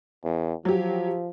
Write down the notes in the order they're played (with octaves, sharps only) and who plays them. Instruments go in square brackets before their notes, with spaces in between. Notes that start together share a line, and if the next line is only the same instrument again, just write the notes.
[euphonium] E2
[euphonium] F3 [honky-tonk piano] F#3 G4